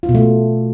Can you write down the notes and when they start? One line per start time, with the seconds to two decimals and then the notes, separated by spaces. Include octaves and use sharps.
0.03 F4
0.09 B2
0.15 A3